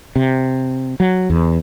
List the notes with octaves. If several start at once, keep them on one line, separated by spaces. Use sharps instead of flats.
C3
F#3
E2